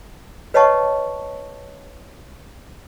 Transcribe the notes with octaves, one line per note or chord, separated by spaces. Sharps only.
B4 C#5 D#5 F#5 A5 C#6